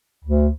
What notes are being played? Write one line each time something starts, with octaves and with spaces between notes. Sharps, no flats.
D2